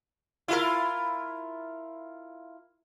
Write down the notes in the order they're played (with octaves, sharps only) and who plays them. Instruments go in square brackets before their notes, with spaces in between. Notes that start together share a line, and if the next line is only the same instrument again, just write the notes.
[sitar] E4 F4 A#4